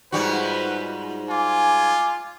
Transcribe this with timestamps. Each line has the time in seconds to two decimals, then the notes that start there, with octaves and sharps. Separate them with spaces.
0.12 G#2 G3 F4 F#4 B4
1.30 F4 G#5 D6